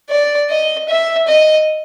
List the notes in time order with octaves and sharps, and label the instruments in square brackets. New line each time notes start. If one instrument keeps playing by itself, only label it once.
[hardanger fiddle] D5
D#5
E5
D#5